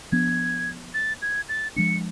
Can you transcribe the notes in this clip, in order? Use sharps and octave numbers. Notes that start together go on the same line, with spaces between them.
F3 B3 D4 G#6
A6
G#6
A6
F3 G#3 D4 C#7